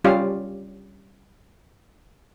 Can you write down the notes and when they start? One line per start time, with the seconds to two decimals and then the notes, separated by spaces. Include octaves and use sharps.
0.04 G3 C#4 F4 G4 D5 F5